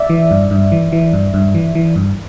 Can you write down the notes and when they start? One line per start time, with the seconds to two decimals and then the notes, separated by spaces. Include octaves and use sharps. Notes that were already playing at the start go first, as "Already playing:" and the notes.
Already playing: D5 E5
0.10 E3
0.31 G2
0.51 G2
0.72 E3
0.93 E3
1.13 G2
1.34 G2
1.55 E3
1.75 E3
1.96 G2